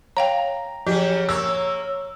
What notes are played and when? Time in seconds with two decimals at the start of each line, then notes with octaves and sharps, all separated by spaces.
0.17 C#5 F5 G5 A#5
0.87 C#3 F3 F#3 G4
1.29 A#3 C#5 E6